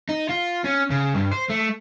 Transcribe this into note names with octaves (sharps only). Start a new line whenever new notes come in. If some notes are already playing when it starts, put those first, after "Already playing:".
D#4
F4
C#4
C#3
G2
C5
A3